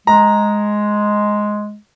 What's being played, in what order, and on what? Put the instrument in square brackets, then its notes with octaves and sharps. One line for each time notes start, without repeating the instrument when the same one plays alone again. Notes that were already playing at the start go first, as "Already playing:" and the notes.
[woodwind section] G#3 [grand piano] A#5